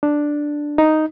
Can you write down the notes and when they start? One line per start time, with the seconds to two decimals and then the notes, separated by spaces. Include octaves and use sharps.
0.03 D4
0.78 D#4